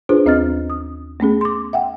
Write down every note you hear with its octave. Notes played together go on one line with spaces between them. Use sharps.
D4 F4 G#4 B4 C5
D#2 C4 D#5 F6 A6
D#6
A3 B3 C#4 G#4
C6 D6
E5 F#5 G5